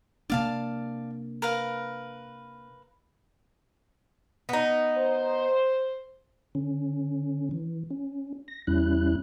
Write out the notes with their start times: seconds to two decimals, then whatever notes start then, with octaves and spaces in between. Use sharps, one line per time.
0.30 C3 A#3 D4 D5 F5 A5
1.42 A#4 B4 F5
4.49 B3 D#4
4.97 C5
6.55 D3 C#4
7.51 E3
7.91 C#4
8.48 A#6
8.67 E2 G3 C#4 E4 F#6